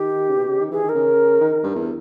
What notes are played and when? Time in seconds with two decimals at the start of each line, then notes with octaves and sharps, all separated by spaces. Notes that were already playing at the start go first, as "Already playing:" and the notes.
Already playing: D#3 G4
0.29 C#3
0.37 B2
0.48 C#3
0.60 D#3
0.71 E3 G#4
0.83 D#3
0.89 A#4
0.95 C#3
1.41 D#3
1.63 G2
1.75 E2